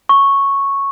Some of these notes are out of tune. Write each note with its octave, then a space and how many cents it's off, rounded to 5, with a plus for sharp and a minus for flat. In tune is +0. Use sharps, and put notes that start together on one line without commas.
C#6 -5